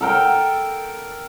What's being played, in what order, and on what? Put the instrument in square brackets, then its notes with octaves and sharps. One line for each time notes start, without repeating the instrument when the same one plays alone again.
[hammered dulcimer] A4 A#4 G5